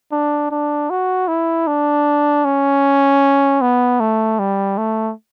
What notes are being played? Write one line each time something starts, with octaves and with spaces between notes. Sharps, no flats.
D4
D4
F#4
E4
D4
C#4
B3
A3
G3
A3